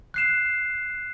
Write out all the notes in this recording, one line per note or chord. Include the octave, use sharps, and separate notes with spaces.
F#6 C7 E7